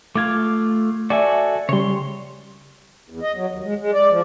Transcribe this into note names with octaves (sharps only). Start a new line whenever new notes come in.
A3 F4 F5 D6 G#6
F#4 A4 D5 E5 G#5
C#3 G3 C#5 C6
E2
D#5
F#3
D#2
G#3
G#3
D5
F3